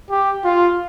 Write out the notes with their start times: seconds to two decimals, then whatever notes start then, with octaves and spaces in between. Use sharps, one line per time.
0.10 G4
0.44 F4